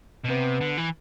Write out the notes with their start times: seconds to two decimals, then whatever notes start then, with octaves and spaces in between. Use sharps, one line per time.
0.25 B2
0.29 C3 B3
0.61 D3
0.77 E3